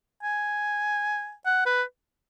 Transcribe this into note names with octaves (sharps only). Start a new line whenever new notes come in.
G#5
F#5
B4